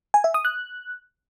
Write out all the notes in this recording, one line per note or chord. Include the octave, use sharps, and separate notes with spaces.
G#5
E5
D#6
F#6